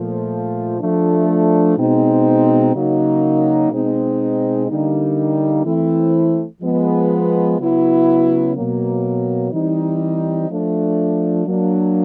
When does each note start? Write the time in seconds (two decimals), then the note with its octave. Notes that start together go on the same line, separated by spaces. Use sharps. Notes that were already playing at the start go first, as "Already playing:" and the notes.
Already playing: A#2 F3 A3
0.80 F3 A3 D4
1.77 B2 G#3 C4 D#4
2.74 C#3 F#3 A#3 D#4
3.71 B2 G#3 C4 D#4
4.68 D3 G3 A#3 D#4
5.65 E3 A3 C4 E4
6.61 F3 G#3 B3
7.59 C#3 F#3 B3 E4
8.55 B2 F#3 A#3
9.52 E3 G3 C4 D#4
10.49 F3 A3 D4
11.46 F#3 A#3 D4